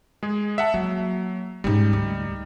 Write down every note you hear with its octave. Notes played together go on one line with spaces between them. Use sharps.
G#3 G#4
E5 F#5 A5
F#3 A#3
G#2 G3 C#4 D#4
D2